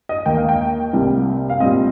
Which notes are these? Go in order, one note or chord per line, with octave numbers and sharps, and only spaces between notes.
D#5
D#2 D#3 A#3 G5
F5
G5
C2 C3 G3 A#3
F5
A#2 G3 C4 D#5